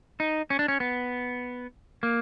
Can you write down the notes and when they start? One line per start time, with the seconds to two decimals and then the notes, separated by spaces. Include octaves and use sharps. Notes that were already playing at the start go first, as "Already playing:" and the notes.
0.20 D#4
0.50 C#4
0.59 D4
0.68 C#4
0.80 B3
2.03 A#3